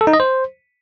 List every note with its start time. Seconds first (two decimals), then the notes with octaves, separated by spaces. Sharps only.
0.01 A4
0.07 D#4
0.13 D#5
0.20 C5